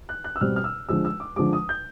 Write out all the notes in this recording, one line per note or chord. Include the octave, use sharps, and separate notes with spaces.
F#6
F#6
E6
B2 G3 C4 F6
F6
E6
D3 F3 G#3 E6
E6
D6
D3 F3 G#3 D6
D#6
G6